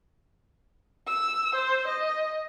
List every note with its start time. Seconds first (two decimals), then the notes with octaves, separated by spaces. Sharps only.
1.08 E6
1.55 C5
1.87 D#5